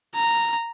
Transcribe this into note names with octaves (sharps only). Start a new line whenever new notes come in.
A#5